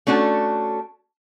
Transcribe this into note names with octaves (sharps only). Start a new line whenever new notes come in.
A3 C#4 D4 F#4 A4